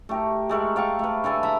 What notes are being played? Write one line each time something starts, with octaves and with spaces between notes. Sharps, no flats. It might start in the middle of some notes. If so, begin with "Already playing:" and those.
A3 G4 A#4
G#3 A3 A#4
D5 F5 G5 C#6
A3 B4
D3 A3 A4 G#5
E5 A#5 B5